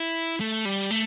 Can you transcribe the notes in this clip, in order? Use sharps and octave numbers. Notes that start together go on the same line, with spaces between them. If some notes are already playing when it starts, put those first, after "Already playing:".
Already playing: E4
A3
G3
A3